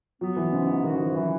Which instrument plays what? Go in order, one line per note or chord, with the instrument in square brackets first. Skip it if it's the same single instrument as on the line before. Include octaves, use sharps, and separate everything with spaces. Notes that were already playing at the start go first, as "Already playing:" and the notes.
[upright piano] F#3 [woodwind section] B3
[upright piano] E3
[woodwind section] G#2 [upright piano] C#3
[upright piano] D#3 [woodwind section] F#4
[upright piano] E3
[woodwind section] E3 [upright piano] F#3